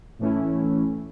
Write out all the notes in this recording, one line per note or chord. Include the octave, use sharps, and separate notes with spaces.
A2 E3 A3 C#4 E4